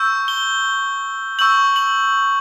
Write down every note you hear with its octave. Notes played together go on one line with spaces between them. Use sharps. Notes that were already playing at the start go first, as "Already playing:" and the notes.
Already playing: C#6 E6 G6
G7
C#6 E6 G6 F#7
F#7